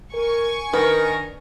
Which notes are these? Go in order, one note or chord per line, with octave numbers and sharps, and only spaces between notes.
A#4 G#5 C#6
D#3 D4 A#4 B4